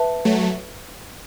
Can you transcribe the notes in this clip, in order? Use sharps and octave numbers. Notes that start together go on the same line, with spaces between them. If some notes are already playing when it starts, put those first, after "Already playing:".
Already playing: B4 E5 A5
F#3 A3